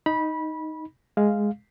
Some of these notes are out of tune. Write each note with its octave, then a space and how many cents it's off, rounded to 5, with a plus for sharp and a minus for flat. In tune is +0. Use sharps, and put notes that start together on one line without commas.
D#4 +5 B5 -20
G#3 +0 F5 +0